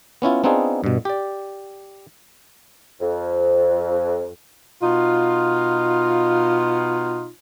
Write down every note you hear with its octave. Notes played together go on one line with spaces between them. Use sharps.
B3 C#4 E4 F4
B3 C4 D4 D#4 F4 G#4
G2 B2
G4 D5
F2
B2 D#4 F4